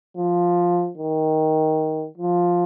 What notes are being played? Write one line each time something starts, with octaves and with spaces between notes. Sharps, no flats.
F3
D#3
F3